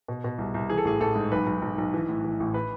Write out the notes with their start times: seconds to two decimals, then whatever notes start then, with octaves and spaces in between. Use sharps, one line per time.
0.08 B2
0.24 B2
0.38 C2
0.54 C2
0.70 E3 G#4
0.78 A4
0.85 A1 G#4
1.00 A1 A4
1.15 G#2
1.32 B1 B4
1.47 B1
1.62 B1
1.78 B1
1.94 E3
2.09 A2
2.24 E3
2.40 A1
2.54 B4